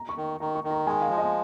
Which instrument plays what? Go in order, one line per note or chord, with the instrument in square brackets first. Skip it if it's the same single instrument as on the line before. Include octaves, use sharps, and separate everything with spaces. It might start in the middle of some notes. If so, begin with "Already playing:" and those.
Already playing: [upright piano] A#5
C#6
[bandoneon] D#3
[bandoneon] D#3 [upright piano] A#5
[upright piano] C#6
[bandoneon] D#3
[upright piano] A#5
[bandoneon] G#3 [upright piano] G#5
[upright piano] F5
[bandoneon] F3
[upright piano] D#5